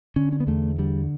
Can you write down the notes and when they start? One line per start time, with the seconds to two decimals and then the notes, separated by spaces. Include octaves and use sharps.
0.16 D3 C#4
0.32 C#4
0.40 B3
0.47 E2 A3
0.78 D3 G3